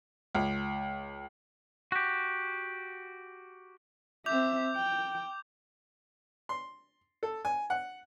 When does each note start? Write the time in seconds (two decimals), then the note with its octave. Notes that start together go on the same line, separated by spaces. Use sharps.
0.35 C#2
1.92 F#4 G4
4.26 C4 E5 D6 G6 F7
4.76 G5
6.49 C6
7.23 A4
7.45 G#5
7.70 F#5